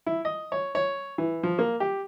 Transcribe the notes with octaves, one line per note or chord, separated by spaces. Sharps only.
E4
D#5
C#5
C#5
E3
F3
A#3
G4